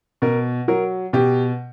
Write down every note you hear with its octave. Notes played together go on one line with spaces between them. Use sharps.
B2 A#4
F#3 A#4
B2 G4